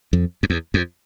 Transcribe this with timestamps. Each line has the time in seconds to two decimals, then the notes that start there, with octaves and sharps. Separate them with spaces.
0.13 F2
0.43 F2
0.50 E2
0.74 F2